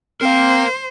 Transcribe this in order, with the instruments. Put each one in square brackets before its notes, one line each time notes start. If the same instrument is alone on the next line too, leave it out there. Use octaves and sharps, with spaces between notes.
[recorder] C4 [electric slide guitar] A#4 F5 [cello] C5